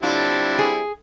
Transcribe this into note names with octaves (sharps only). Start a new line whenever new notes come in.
A2 D3 G3 C4 D4 E4 F4
G#4